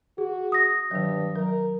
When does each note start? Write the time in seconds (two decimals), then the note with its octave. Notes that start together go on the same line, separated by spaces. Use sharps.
0.18 F#4 G#4
0.52 D#6 A#6
0.91 G2 D#3 F#3
1.36 F#3 A#4